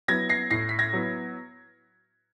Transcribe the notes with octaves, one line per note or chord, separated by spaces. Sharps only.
F#3 B3 E4 G#6 A#6
A#6 C7
A2 A#6 C7
B6
G#6 A#6
F#3 B3 E4